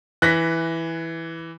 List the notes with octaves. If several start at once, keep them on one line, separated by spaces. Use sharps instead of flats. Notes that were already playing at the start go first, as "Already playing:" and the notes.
E3 F#6 A#6 B6